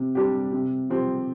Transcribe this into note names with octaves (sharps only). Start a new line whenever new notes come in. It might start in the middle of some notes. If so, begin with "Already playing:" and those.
Already playing: C3
G3 D4 G4
C3
F3 C4 G4